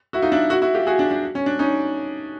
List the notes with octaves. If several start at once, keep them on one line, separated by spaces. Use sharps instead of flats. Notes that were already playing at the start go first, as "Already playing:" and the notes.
E4 F#4
D#4 F4
D4 E4
E4 F#4
E4 F#4
F4 G4
F#4 G#4
D4
D4
C#4
D4
C#4 D#4